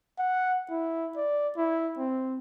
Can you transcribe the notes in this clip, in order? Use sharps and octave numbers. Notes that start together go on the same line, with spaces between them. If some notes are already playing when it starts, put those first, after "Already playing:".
F#5
E4
D5
E4
C4